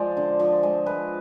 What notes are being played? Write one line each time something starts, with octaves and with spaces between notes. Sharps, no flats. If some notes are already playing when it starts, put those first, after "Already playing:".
Already playing: F3 G#3 C5 D5
D3
F3
G#3
G#3 B4